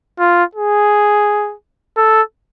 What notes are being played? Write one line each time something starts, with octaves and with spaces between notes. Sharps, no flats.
F4
G#4
A4